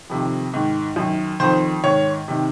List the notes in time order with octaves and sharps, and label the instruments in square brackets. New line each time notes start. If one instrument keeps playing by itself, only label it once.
[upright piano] F2 C3 D#3
G#2 D#3
F#2 D#3
F2 D#3 C5
G#2 D#3 C#5
C3 D#3